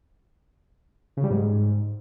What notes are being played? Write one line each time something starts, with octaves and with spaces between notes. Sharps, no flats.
C#3
G3
G#2